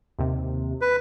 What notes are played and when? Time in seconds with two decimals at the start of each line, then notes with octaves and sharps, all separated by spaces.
0.19 D#2 C3
0.81 B4